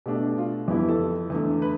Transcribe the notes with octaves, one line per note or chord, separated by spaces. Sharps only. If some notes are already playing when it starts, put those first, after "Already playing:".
B2 A3 D4 G4
F4
F2 E3 B3 E4 G4
G4
A4
E2 D3 A3
B4